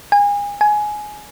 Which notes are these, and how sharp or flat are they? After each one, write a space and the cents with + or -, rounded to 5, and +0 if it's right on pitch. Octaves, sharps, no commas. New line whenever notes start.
G#5 -30
G#5 +15